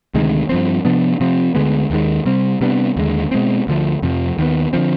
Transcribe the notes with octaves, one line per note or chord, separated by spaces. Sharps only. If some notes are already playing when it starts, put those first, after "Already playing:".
D2 C3 D#3 G#3
G2 F3 C4
C3 F3 B3 D4
C3 F3 C4
D2 D3 G#3 B3
D#2 D#3 G#3
C3 G3 C4
C3 G3 B3 D4
D#2 D3 G#3
B2 G#3 C4
D2 D3 F3
F2 C3 F3
D#2 D#3 B3
D3 F3 C4